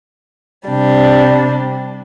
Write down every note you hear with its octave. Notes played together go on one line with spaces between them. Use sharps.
C3 G3 D4